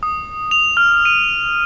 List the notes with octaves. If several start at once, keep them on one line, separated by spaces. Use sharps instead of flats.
D#6
F7
F6
D#7